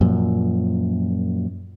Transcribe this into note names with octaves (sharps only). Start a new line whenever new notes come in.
F#2 A#2 F3